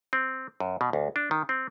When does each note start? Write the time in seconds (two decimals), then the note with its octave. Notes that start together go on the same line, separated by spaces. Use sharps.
0.13 C4
0.60 F#2
0.81 B2
0.93 D2
1.16 D4
1.31 D#3
1.49 C4